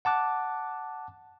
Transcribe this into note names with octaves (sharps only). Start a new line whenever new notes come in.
F#5 A5 D6 F#6